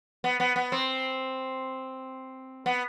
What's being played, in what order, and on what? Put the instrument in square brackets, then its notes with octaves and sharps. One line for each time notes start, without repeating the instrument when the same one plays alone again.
[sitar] B3
B3
B3
C4
B3